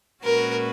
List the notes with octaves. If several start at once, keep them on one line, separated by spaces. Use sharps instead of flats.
A#2 G#3 C#4 F#4 A#4 B4